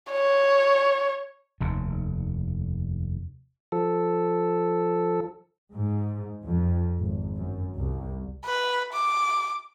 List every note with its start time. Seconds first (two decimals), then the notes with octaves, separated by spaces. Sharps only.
0.12 C#5
1.61 F1 D#2
3.72 F3 A4
5.74 G#2
6.44 F2
7.00 G#1
7.37 F#2
7.78 C2
8.46 B4
8.93 D6